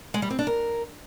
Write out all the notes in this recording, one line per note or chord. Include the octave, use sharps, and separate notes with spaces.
G#3
G3
C4
D4
A#4